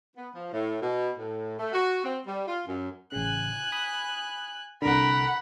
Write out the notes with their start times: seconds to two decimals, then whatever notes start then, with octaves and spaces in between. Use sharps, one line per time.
0.16 B3
0.34 F3
0.52 A2
0.81 B2
1.17 A2
1.59 A3
1.73 F#4
2.04 C4
2.26 G3
2.47 F4
2.66 F#2
3.12 A1 C#3 G#5 F#6
3.72 B5 D#6
4.82 C2 D3 A#4 F#5 B5